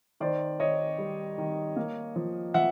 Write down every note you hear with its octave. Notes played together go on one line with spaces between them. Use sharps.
D#3 C5 D5
D#3 C#5 D#5
G3
D#3
A#3
F3
F3 E5 F#5